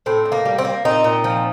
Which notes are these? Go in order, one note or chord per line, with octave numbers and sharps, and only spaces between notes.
A2 C4
A2
A#3
G3
C4
A#3
A#2 C4 D#4
A#2
F3